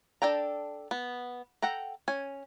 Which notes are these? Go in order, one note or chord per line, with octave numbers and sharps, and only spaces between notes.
D4 A4 G5 A#5
B3
A4 F#5 G5 A#5
C#4 G#5